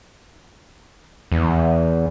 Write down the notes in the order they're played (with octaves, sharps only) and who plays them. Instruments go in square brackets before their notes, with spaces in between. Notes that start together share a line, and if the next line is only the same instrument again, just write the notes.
[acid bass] E2